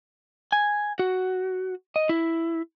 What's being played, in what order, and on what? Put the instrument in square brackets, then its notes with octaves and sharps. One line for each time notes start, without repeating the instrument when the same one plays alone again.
[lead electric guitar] G#5
F#4
D#5
E4